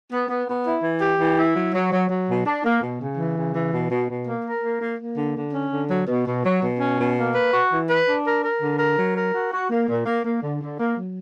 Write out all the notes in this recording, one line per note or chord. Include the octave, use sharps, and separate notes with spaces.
B3
B3
B3
E4
E3
G4
E3
E4
F#3
F#3
F#3
F#3
B2
D4
A#3
B2
C#3
E3
C#3
E3
B2
B2
B2
A#3
A#4
A#3
A#3
A#3
D3
D3
C#4
D3
F#3
B2
B2
F#3
B2
C#4
B2
A#3
B4
F#4
E3
B4
D4
A#4
A#4
D3
A#4
F#3
A#4
F#4
F#4
A#3
A#2
A#3
A#3
D3
D3
A#3
F#3